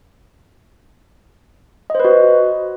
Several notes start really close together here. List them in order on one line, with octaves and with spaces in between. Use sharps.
D#5 C5 B4 F#4